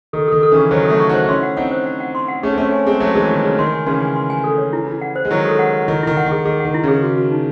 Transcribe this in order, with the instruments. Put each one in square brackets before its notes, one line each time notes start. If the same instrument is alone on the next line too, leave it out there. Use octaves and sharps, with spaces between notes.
[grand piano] D#3 [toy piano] A4
[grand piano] D#3 [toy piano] A4
[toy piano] A4
[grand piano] C#3 E3 [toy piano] C#6
[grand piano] D#3 F#3 [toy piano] C5
[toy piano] A4
[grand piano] F#3 A3
[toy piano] C#6
[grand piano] D#4 F#4 [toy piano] C5
[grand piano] F#4
[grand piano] C#4 E4 [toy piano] C6
[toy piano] F#5
[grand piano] C4 D#4 [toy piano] F#5
[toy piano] C5
F#5
F#5
C6
F#5
[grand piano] A3 C#4 [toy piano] G#4
[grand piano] C4
[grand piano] A3 C#4 [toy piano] C#5
[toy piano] G#5
[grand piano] G#3 C4 [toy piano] G#4
[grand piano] F#3 A3 [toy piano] G#4
[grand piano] E3 G#3 [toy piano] G#4
[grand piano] D#3 [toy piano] G#4
[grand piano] C#3 [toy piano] C#5
[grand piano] D#3 [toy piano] C6
[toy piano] G#5
[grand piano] C#3 E3 [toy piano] C6
[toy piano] G#5
C6
G#5
A4
C#5
E4
E4
F#5
C5
[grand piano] G#3
[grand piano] D#3 F#3 [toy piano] E4
[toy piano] A4
F#5
F#5
[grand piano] D#3 [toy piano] E4
[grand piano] D#3 [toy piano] E4
[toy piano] F#5
[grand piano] D#3
[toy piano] G#4
[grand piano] D#3 [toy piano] G#4
[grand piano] D#3 [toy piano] F#5
[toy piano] E4
[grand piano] C#3 [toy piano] G#4
[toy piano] F#4
F#4
D#4